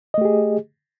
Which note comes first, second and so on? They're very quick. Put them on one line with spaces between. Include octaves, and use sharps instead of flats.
D#5 A3 G4 G#4